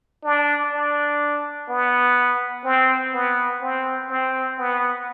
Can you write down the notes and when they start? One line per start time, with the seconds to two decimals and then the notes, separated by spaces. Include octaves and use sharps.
0.24 D4
0.72 D4
1.69 B3
2.65 C4
3.13 B3
3.61 C4
4.10 C4
4.58 B3